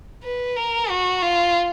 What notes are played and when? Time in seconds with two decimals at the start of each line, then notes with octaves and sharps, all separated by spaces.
0.24 B4
0.56 A#4
0.89 F#4
1.22 F4